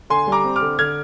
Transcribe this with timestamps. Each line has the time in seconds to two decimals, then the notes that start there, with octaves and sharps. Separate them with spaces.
0.10 D3 G#5 C6
0.27 G3
0.32 A#5 D6
0.44 C4
0.56 D6 F6
0.61 D3
0.78 D3 F6 G#6